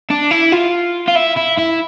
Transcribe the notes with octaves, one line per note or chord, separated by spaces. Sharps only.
D4
E4
F4
F4
E4
E4
E4